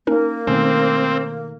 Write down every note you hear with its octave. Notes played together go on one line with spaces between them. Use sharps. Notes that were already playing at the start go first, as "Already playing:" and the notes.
A#3 C#4 D#4 A#4
B2 D#3 A3 C4 C#4